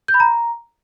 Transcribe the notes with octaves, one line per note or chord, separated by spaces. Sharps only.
G6
B5
A#5